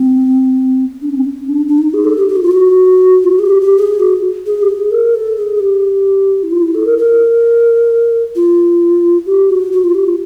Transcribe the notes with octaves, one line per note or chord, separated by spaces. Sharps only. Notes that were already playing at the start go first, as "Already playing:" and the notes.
Already playing: C4
D4
C#4
C4
C#4
D4
D4
D#4
G#4
A4
G4
G4
F#4
F4
F#4
F4
F#4
G#4
G4
G4
G#4
F#4
G#4
G4
G#4
A#4
A4
G#4
G#4
G4
E4
F4
E4
A4
A#4
A#4
F4
G4
F#4
F#4
F4
G4
F4